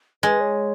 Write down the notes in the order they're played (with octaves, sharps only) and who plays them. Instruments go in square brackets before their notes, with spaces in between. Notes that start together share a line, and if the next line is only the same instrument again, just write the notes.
[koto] G#3 [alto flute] B4
[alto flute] C#5